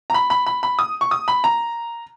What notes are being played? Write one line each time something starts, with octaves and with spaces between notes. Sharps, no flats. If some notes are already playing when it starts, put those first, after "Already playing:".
A#5
B5
B5
B5
B5
D#6
C#6
D#6
B5
A#5